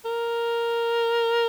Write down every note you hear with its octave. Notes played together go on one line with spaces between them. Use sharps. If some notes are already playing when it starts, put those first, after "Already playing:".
A#4